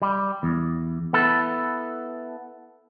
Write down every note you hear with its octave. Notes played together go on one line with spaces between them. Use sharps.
G3
E2
B3 E4 A4